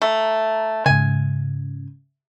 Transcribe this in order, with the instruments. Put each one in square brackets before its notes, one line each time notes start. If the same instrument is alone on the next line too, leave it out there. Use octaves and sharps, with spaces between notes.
[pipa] A3 [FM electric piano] A#5
[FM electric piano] G#2 C#3 [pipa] G#5